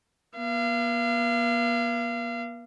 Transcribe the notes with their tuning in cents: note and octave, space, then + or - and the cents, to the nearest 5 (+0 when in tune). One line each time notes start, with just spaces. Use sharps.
B3 -45 F5 -30